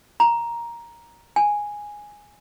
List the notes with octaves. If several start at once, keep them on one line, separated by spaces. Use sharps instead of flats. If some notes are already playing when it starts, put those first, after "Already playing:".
A#5
G#5